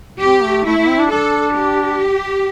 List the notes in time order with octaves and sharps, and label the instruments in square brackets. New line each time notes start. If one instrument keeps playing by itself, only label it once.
[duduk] C4 [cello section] G4
[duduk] A3
[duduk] A3 [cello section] E4
[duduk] A3
C4
D4
[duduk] D4 [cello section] A4
[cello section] G4